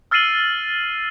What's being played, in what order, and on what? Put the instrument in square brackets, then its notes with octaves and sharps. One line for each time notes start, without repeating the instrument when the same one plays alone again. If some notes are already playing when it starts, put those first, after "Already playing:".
[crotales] E6 F6 A6 C7 D#7 F#7